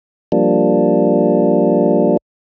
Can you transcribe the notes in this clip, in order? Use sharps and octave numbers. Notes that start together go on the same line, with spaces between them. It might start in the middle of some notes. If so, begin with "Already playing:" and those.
F3 G3 A#3 D4